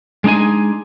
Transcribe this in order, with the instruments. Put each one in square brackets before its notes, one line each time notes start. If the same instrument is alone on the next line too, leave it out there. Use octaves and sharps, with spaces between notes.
[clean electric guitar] G#3 D4 D#4 G#4 G#5